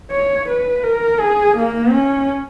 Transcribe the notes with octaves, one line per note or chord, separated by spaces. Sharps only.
C#5
B4
A#4
G#4
A#3
C#4